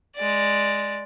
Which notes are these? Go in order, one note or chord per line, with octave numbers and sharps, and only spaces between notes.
G#3 D5